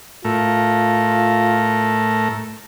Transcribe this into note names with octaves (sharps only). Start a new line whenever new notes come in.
A2 A3 F4 A#4